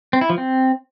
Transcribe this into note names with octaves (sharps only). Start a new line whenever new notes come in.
C4
E4
F3
C4